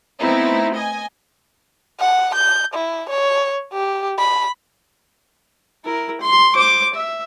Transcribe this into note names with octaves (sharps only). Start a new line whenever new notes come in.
A3 B3 C4 D#4 E4
D#5 G#5
F#5
G6
E4
C#5
G4
B5
E4 A#4
C6
C5 D6
E5